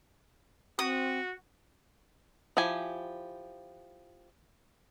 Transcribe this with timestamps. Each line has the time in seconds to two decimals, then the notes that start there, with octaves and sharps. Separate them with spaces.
0.79 C4 F#4 D#6
2.57 F3 E4 G4 G#5